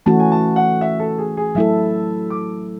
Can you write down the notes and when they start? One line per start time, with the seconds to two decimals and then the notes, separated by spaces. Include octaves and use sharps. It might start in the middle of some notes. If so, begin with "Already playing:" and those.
0.06 E3 A3 C#4 F#4 A5
0.20 G#5
0.32 A5
0.56 F#5
0.81 E5
1.00 A4
1.18 G#4
1.37 G#4
1.55 F#3 A3 E4 A4 E5
2.30 D6